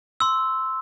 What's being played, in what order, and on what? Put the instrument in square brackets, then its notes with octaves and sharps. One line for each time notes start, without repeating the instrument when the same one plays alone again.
[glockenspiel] C6 E6